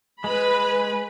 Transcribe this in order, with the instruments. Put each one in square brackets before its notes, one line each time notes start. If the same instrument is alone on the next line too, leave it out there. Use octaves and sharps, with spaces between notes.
[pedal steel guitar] G#3 [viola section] B4 B5